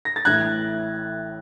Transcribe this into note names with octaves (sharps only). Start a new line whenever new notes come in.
A#6
A6
A1 A2 E3 F#6 G#6